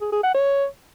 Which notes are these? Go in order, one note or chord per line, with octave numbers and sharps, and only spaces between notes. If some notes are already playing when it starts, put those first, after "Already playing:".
G#4
G#4
F#5
C#5